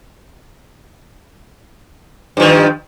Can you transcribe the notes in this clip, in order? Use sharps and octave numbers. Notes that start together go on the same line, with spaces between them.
G2 D#3 F3